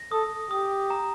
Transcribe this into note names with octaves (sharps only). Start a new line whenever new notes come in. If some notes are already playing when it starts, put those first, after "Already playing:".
Already playing: A#6
A4 D#6
G4 D#6
A#5